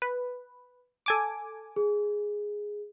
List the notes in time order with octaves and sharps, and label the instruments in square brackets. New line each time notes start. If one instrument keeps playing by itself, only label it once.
[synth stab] B4
A4 G#5 D6
[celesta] G#4